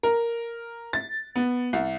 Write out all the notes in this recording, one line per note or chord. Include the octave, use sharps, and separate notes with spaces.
A#4
A6
B3
C2